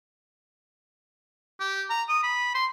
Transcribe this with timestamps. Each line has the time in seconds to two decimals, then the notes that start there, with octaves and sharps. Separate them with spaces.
1.60 G4
1.90 A#5
2.09 D#6
2.23 B5
2.54 C6